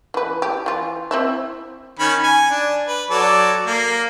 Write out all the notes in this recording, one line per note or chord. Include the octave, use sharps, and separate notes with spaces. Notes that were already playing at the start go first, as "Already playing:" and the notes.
E3 B4
G4
E3 F4
C4 E4 E5
D#3 C#4 B5
G#5
D4
B4
F#3 A4 D5
A#3